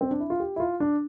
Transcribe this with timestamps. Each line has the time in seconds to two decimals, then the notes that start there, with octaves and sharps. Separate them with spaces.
0.01 C4
0.11 D4
0.20 E4
0.30 F4
0.40 G4
0.56 E4
0.60 F4
0.80 D4